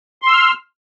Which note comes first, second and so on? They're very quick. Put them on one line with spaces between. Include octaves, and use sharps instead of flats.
C6 E6 F6